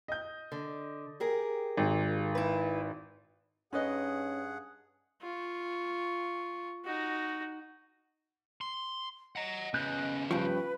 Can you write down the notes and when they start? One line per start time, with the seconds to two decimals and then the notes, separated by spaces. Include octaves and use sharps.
0.08 D#5 G6
0.52 D3
1.20 G4 G#4 A#4
1.77 G#1
2.35 E4 B4
3.73 G2 C#4 D#4 G#4 B4 D#5 F#5
5.21 F4 C#6
6.85 D#4 F#4
8.61 C6
9.36 D#5 F#5 A#5
9.74 C#3 B3 C#4 F#6 G6
10.31 G2 F3 C#4 B4 G5 C#6